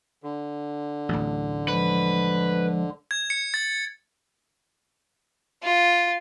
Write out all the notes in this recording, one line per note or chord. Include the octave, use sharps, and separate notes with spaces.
D3
D1 A1
F3 G#3 B4
G#6
C#7
A6
F4